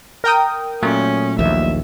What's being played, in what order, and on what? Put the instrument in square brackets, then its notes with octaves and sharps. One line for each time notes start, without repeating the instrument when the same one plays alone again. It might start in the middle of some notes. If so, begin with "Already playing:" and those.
[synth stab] A#4 G5 D#6
[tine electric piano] A#2 F#3 A3 [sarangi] C#4
[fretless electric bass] A#1 D#2 [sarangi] E5